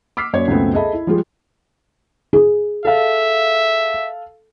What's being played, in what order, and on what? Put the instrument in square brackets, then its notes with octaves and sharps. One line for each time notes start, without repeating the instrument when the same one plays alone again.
[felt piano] D6 E6 F6 B6 C7
F#2 F#3 A#3 C#5 D5 G#6
C#2 F#2 B2 A3 B3 C4
G#4 A4 D#5 E5 A5 B5
E4
F3 G3 G#3 F4 G4 G#4
G#4
[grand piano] A4 F5 [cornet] E5